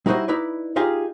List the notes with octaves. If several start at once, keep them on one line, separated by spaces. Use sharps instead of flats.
G3 D#4 E4 F#4 C5 D#5
D#4 E4 B4 D5
D#4 F4 G4 G#4 D#5 F5